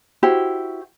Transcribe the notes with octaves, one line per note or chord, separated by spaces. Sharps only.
E4 F#4 G4 C5